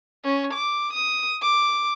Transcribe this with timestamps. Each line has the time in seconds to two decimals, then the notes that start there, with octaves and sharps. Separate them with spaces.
0.24 C#4
0.54 D6
0.93 D#6
1.42 D6